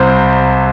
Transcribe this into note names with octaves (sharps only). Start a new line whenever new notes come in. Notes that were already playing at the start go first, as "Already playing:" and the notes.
Already playing: C2 C3 C5